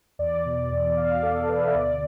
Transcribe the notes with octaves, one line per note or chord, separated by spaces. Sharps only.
E2 D5
B2
E2
B2 F5
E2 A4
B2 B4
E5
D2 D5